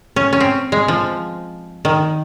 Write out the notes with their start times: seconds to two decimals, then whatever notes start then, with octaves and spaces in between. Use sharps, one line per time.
0.16 C#4
0.33 C#4
0.40 C4
0.72 G#3
0.88 F3
1.85 D#3